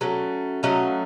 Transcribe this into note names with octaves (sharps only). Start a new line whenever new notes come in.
F#3 A3 C#4
F#3 A3 C#4 D#5 F5